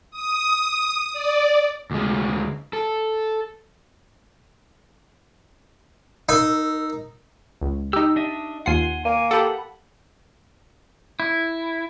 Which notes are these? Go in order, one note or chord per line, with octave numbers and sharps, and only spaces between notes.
D#6
D5
D2 G#3
A4
D#4 A#4 E6
C#2
D#4 G4 E6
D4 D#5 E5
D#2 F4 F#5 G#5 C6 C7
A#3 G#5
G4 A4 F#5 B5
E4